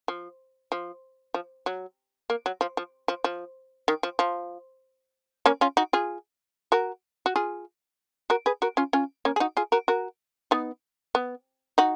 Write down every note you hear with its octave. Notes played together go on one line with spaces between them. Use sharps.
F3
F3
F3
F#3
A#3
F#3
F3
F3
F3
F3
D#3
F3
F3
A#3 C#4
C#4 F4
D#4 F#4
F4 G#4
F#4 A#4
F#4
F4 G#4
F#4 A#4
G#4 B4
F#4 A#4
C#4 F4
C#4 F4
A#3 C#4
G#4
D#4 F#4
F4 G#4
F#4 A#4
F#4 A#4
B3 D#4
B3
D#4 F#4